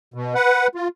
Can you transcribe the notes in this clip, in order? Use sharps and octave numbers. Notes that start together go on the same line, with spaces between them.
B2
B4 F#5
F4